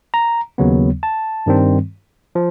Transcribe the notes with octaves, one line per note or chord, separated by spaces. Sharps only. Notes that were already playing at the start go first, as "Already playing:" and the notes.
A#5
D#2 C#3 F#3 B3
A5
G2 D#3 G3 C4
F3